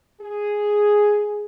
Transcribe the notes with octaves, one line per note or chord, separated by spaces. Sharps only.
G#4